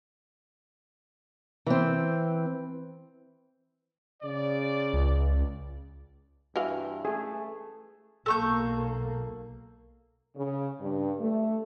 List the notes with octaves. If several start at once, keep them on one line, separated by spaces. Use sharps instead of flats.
E3 C4
C#3 D5
C#2
G2 E3 F#4 F5
A3 G#4
B1 A#3 A4 C#6 G6
C#3
G2
A3